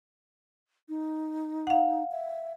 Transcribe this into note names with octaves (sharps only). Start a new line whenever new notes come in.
D#4
F5 F#5
E5